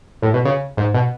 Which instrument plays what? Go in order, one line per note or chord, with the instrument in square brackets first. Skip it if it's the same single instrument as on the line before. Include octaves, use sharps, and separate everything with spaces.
[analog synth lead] A2
B2
C#3
G#2
B2